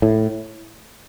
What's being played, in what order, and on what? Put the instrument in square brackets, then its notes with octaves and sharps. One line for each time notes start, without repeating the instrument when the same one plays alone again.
[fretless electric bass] A2